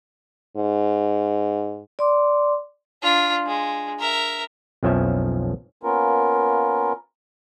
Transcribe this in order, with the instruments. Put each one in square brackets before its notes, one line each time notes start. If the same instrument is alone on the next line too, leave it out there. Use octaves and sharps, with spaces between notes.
[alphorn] G#2
[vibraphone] D5 C6 D6
[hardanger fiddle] D4 F4
G#3
A#4 E5
[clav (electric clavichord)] B1 F2 F3 C#4 E5
[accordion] A#3 B3 C#4 F4 A#4